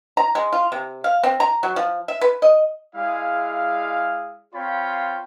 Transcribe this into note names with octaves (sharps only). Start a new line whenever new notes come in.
A#5
G#3
F4
C3
F5
C4
A#5
F#3
F3
E5
B4
D#5
G#3 E4 G#4 D5 F5
C4 F4 C#5 F5 G5 B5